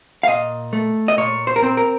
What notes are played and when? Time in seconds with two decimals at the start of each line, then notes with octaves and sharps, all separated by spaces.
0.23 F5
0.27 A#2 D#5
0.73 A3
1.08 D#5
1.18 A#2 C#5
1.47 C5
1.56 A#4
1.62 C4 C5
1.77 A#4